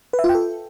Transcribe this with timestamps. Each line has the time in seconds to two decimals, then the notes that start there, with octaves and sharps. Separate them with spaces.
0.13 B4
0.19 E5
0.24 F4
0.29 G5
0.35 A4